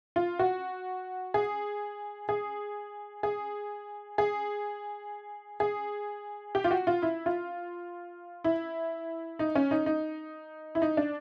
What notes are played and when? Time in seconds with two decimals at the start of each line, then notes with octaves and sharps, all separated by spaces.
0.16 F4
0.39 F#4
1.34 G#4
2.29 G#4
3.23 G#4
4.18 G#4
5.60 G#4
6.55 G4
6.64 F4
6.71 F#4
6.87 F4
7.02 E4
7.26 F4
8.44 E4
9.39 D#4
9.55 C#4
9.71 D#4
9.86 D#4
10.75 E4
10.82 D#4
10.97 D4